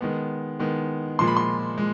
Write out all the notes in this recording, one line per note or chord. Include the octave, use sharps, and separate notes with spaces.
D#3 G#3 B3
D#3 G#3 B3
A#2 F3 G#3 C6
B5
C6
G#3